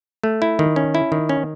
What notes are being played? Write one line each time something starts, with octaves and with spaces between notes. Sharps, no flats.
A3
E4
D#3
C#4
E4
D#3
C#4